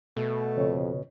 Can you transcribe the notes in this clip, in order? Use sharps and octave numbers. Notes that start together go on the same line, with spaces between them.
B2 A3
F2 C#3 C#5